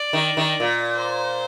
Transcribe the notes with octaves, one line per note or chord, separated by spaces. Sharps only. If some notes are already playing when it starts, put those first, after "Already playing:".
Already playing: D5
D#3
D#3
A#2
C5